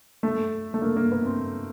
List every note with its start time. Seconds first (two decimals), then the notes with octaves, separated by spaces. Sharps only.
0.23 A3
0.74 A3
0.82 A#3
0.96 A#3
1.12 B3
1.26 C4